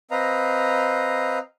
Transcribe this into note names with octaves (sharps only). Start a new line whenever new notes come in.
C4 B4 D#5 F5 A#5